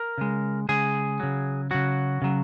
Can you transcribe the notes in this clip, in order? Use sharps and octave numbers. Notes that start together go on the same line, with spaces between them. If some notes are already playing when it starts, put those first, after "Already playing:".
Already playing: A#4
C#3 G#3
C#3 G#3 G#4
C#3 F#3
C#3 F#3 F#4
C#3 F#3